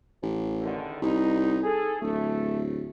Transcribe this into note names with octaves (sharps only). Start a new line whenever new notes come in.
A1
E2 D3 D#3
C2 D#4
G#4 A4
D1 A3